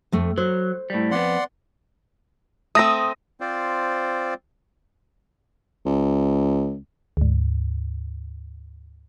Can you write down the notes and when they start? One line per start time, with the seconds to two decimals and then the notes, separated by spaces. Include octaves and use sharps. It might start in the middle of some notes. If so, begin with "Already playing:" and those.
0.12 F2 A3
0.38 F#3 C5
0.90 A2 G3
1.11 F2 B3 D5 F#5 C6
2.75 A3 C4 D#6 A#6
3.40 C4 F4 C5 D5
5.85 C#2
7.17 D2 G#2